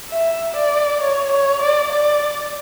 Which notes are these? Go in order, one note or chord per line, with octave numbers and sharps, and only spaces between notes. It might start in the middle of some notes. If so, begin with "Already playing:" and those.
E5
D5
C#5
C#5
D5
D5